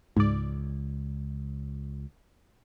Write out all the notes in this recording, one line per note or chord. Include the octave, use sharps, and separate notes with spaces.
C#2 G#2 D5